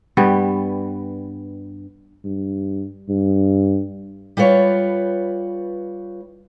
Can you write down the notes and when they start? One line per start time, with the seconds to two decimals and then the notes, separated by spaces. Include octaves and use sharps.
0.17 G2 G3 B3
2.24 G2
3.09 G2
4.37 G3 F4 B4 C#5